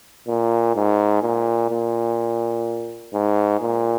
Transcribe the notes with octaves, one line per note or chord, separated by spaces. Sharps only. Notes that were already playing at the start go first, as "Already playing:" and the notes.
A#2
G#2
A#2
A#2
G#2
A#2